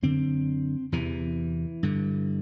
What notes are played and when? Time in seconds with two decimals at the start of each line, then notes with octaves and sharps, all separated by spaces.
0.02 F#2 D3 C4
0.92 E2 C3 E3
1.83 G2 D3